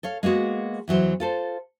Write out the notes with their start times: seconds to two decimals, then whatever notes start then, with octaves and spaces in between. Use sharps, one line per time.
0.03 A4 C#5 F5
0.23 G#3 A#3 B3 F#4 G#4
0.88 E2 E3 F#3 C5
1.20 F4 A4 C5